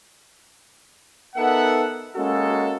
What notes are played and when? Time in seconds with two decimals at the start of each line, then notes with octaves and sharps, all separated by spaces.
1.36 B3 D#4 A4 A#4 E5 F#5
2.15 G#3 A#3 C#4 F#4 A4